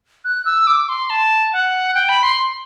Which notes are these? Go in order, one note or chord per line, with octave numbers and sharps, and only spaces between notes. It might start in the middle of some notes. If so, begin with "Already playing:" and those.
F#6
E6
D6
C6
A5
F#5
G5
B5
C6